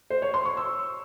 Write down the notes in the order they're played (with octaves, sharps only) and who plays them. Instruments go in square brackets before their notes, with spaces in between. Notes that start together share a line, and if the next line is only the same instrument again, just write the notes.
[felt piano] C5
C#5
C6
C#6
E6